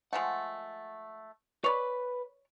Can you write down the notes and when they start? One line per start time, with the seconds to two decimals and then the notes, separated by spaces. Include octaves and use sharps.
0.13 F3 G#3 A3 F#5
1.64 B4 C#5 D5 B5